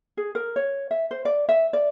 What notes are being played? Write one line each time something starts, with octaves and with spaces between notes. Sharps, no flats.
G#4
A#4
C#5
E5
C5
D5
E5
D5